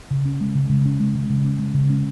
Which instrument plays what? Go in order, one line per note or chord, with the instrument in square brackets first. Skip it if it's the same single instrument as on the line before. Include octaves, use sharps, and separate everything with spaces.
[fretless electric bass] C#3
C#4
G#3
C#3
C#3
C#4
G#3
C#3
C#3
C#4
G#3
C#3
C#4